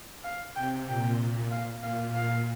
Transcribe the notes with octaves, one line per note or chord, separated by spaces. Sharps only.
F5
C3 G5
A#2 G5
A#2
F5
A#2 F5
F5